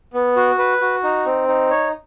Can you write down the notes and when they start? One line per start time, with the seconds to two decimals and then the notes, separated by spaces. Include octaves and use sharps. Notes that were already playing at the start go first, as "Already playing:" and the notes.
0.14 B3
0.36 F#4
0.58 B4
0.81 F#4
1.04 D#4
1.26 C4
1.48 D#4
1.70 C#5